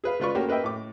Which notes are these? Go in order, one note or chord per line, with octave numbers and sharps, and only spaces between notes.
G#4 B4 F5
C#3 G#3 F4 B4 D5 C#6
A3 A#3 C#4 F#4 G4
A#3 B4 D#5 E5 G5
A2 D6